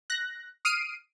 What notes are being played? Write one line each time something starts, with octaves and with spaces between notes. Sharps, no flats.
F#6 A#6
D#6 F6 C7 D7 D#7